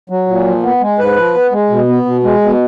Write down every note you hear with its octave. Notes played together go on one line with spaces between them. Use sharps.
F#3
A#2
F3
B3
G#3
G#2 B4
F3
B3
G#3
B2
B3
B2
G#3
B2